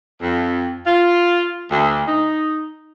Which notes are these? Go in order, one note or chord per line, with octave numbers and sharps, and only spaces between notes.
F2
F4
D2
D#4